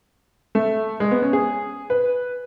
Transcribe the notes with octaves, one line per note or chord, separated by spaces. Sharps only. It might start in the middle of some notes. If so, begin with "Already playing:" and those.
A3
G#3
B3
C#4
G#4
B4